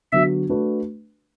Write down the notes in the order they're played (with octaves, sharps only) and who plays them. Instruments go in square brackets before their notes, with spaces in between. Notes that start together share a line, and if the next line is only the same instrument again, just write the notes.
[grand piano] D3 F#3 B3 F#4 [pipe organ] E5
[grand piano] A3 D4 F#4 B4